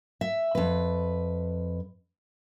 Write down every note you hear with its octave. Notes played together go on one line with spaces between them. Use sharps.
E5
F2 B4